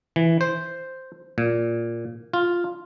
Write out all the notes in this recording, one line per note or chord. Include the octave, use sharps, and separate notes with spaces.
E3
C5
A#2
F4